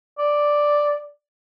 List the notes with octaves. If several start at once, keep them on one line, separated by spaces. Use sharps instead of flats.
D5